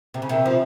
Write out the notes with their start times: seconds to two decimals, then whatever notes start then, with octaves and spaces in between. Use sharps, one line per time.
0.14 C3
0.22 C#3
0.29 C3 D#3
0.46 F3